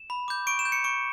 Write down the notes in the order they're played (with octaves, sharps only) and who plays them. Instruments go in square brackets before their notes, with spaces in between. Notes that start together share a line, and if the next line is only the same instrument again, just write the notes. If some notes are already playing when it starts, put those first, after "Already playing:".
Already playing: [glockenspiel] E7
B5
D6 G6
C#6 D7
E7
G6
C#7
C#6 D7